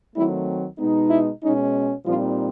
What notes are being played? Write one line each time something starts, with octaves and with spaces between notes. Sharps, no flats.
D#3 F#3 A3 C4 E4
B2 G#3 B3 D#4
E4
B2 G#3 C#4 D#4
A#2 F3 G3 C4 D#4 F4